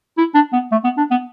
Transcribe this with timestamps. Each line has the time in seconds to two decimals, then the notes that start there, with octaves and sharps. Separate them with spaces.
0.17 E4
0.34 D4
0.53 B3
0.71 A3
0.84 B3
0.97 D4
1.11 B3